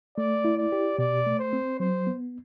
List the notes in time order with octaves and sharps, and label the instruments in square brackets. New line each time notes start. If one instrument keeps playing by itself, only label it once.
[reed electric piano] A3 [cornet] D5
[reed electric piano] E4
[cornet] D5
[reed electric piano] G4
[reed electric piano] B2 [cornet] D5
[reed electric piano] A3
[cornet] C5
[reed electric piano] C4
[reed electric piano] F#3 [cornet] C5
[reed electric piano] B3